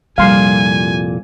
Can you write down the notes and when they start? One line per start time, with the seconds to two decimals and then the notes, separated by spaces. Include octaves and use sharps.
0.18 C2 F2 A#2 G3 F5 G#5 C6